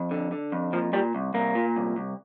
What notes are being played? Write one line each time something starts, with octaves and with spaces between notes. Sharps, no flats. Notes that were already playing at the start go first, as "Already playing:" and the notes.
Already playing: F2
D3
D3
F2
A#2 F3
A#2 G3
C2
C2 A#3
A#2
C2
C2